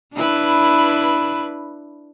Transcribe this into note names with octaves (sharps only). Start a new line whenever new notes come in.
D4 E4 B4